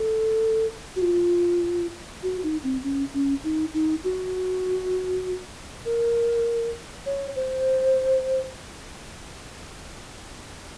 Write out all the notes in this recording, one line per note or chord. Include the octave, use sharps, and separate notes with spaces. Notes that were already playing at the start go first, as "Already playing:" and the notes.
Already playing: A4
F#4
F4
F#4
D#4
C4
C#4
C#4
D#4
D#4
F#4
A#4
C#5
C5